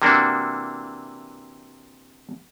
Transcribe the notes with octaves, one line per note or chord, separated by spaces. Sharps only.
C3 E3 A#3 D4 F#4